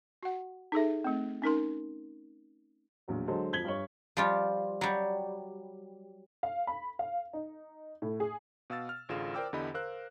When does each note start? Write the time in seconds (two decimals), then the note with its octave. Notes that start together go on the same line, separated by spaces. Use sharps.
0.23 F#4 F#5
0.72 D#4 G#4 A4 E5
1.04 A3 C4
1.42 C#4 D#4 A#4 C6
3.08 A#1 E2 F#3
3.27 D3 F#3 G#3 A4 C5
3.53 F2 F3 G#6 B6 F#7 G7
3.65 G2 C#5
4.17 F3 G3 F4
4.81 F#3 G3
6.43 F5
6.67 B5
6.99 F5
7.33 D#4
8.02 A2
8.20 G#4
8.70 B2 F5 E6 A6
8.89 F6
9.09 A1 D3 F4 G#4 F5 E7
9.34 A#4 C5 D5 G5 D6 E6
9.53 E2 D3 E4 G4 D#5 B5
9.74 A#4 C5 F5 E6 F#6